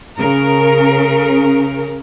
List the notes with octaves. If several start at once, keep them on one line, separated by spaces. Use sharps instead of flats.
C#3 A#4